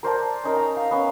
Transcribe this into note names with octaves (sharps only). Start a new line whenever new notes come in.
A#4 C5 D5 A5
C#4 D#4 A#4
A#5
F5
B3 C#4